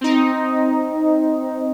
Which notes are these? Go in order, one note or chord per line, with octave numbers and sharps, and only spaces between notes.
C4 D#4